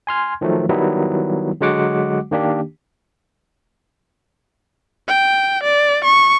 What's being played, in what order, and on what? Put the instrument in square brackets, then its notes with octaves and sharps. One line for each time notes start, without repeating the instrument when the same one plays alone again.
[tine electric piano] G#5 C6 F6 G#6
D#3 F3 F#3 A3
D#3 F#3 G3 B3 E4
D3 F#3 G#3 F#4 F#5 D6
D#3 A#3 D4 G4
[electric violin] G5
D5
C#6